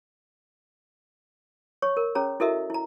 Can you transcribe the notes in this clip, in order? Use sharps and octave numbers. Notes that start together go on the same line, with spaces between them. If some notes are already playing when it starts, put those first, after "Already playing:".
C#5 C#6
A#4
C#4 G#4 C#5 A#5
E4 F#4 A4 A#4 D#5 E5
E4 A#5